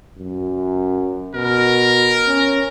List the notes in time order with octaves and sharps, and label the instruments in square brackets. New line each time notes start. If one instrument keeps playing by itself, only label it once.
[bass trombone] F#2
[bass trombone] B2 [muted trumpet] A#4
[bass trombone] C#4